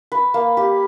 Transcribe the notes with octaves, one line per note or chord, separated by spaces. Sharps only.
B4
A#3
G4